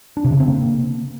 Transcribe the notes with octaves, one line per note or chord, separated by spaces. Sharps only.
D4
C3
C#3
C4
A#3